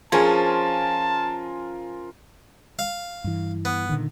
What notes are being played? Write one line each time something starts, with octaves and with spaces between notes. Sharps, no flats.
F3 C#4 F4 G#4 A#4 G#5 A5
F5
G2 E3
B3
A#2 D3 D#3